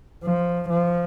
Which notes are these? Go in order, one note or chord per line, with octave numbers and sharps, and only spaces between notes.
F3
F3